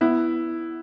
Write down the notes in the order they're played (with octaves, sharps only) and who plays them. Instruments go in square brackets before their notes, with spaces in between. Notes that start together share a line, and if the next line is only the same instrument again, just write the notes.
[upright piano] B3 E4